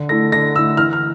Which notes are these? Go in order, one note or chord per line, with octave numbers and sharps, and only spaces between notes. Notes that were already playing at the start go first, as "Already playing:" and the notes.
Already playing: D3
A3 E4 A#6
D3 A#6
A3 E4 E6
E3 F6
F6